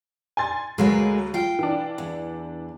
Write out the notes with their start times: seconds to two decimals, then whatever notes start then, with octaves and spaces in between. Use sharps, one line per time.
0.37 G#5 C6 A6
0.78 D2 F#3 G#3 A#3 B4
1.34 F4 G5
1.59 E3 D4
1.98 E2